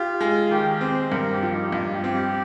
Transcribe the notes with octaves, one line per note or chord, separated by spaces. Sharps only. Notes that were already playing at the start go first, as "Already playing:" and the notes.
Already playing: F4 G4
G#3
D#3 G4
C4 C5
G2 A#4
G4
F3
D#4
G2 F4
G4
C4
G4